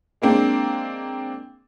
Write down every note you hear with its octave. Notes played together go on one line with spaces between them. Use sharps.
G#3 A#3 C4 D4